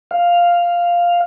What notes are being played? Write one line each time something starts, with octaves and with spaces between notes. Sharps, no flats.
F5